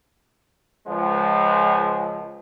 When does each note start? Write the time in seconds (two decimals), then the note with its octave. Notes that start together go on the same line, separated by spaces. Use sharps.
0.86 C#2 F3 G#3